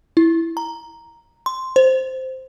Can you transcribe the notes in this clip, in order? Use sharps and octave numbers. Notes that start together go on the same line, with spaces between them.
E4
A#5
C6
C5